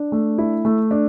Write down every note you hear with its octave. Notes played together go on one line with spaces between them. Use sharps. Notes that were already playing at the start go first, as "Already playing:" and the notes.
Already playing: D4
A3
E4
A3
D4